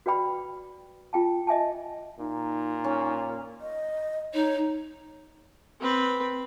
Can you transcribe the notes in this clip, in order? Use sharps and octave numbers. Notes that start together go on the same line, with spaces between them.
F#4 B4 D5 G5 B5
F4 G5 A5
D#5 E5 G#5 A5
A#2 D#4
C#4
D#5
D#4 C#5
C4 B4